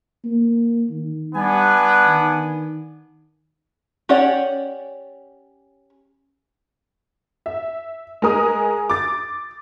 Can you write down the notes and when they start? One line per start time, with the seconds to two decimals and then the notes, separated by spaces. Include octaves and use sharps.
0.24 A#3
0.91 D#3
1.35 G3 B3 D4 G#5
2.07 D#3
4.09 C#4 G4 C#5 D5 F#5
7.46 E5
8.22 G#3 G#4 A#4 D#6
8.90 D6 A6